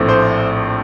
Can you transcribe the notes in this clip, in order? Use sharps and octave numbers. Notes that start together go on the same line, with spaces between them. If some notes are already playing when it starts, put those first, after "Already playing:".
Already playing: A#1 A2 A3 C4
C5